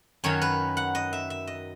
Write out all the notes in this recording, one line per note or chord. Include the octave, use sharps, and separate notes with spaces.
F#2 D#3 F#3 C#5
B4
F#5
D#5
E5
E5
D#5